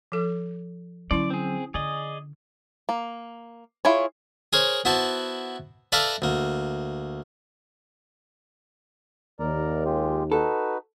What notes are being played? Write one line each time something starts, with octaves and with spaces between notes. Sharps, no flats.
F3 A4
D3 F#3 C#4 E4 D5 C#6
C4 G#4
D3 G#4 D5 D#5
A#3
E4 F4 G#4 C#5
G#4 A#4 C5 C#5
B3 E4 F#4 C5 A5
A4 B4 D5 E5 F5 A#5
D2 A#3
D#2 A#4 D5 A#5
G#3 F4 G4
D#4 F#4 A4 B4